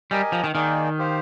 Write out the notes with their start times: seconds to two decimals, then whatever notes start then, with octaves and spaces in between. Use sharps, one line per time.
0.11 G3 G4 A#4 D#5 G#5
0.32 F3
0.44 D#3
0.54 D#3 A#3 D#4 G#4 D5 G5
0.98 G4 C5 F5